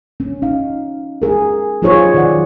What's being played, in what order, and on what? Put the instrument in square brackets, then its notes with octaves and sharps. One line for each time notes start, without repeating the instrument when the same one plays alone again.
[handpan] C#4
C#4 D#4 F5
G#4 A#4
F#3 D#4 F4 G#4 C5 C#5
D#3 F#3 D5 F#5